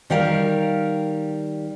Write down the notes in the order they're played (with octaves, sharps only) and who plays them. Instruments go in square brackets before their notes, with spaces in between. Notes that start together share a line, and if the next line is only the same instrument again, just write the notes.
[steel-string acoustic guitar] D#3 G3 A#4 F5